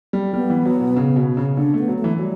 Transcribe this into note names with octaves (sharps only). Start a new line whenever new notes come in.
G3
G3 B3
E3
F#3
B2
C#3
B2
C#3
D3 D4
A3 B3
F#3
A3
E3
F#3 G3